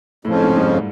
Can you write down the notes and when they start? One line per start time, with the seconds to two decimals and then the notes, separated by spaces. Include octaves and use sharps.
0.25 F2 A2 C#3 F3
0.42 G#2
0.56 G#2
0.60 G2